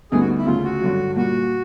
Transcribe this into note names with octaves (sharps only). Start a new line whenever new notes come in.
D2 D3 G3 B3 D#4 G#4
F#4
E4
D2 C#3 F3 F4
F#4
G2 D3 F#3
A#2 G3 A#3 F#4